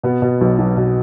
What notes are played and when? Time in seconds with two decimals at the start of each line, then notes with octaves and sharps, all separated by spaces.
0.03 B2 B3
0.22 B2
0.41 B1
0.59 B1
0.77 B2